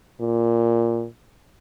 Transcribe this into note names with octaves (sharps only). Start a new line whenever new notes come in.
A#2